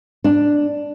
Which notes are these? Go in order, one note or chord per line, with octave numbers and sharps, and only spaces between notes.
D4